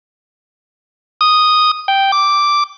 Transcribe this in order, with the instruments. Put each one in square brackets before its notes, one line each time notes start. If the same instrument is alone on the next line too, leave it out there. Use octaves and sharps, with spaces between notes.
[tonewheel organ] D#6
G5
D6